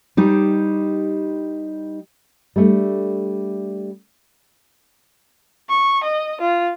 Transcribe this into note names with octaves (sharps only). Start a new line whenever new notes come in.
G3 D#4 G4 C5
G3 A3 D4
C#6
D#5
F4